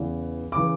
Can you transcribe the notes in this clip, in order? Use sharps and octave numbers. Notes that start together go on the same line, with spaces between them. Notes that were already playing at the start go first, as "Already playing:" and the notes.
Already playing: E2 C#3 E3
C#3 E3 D6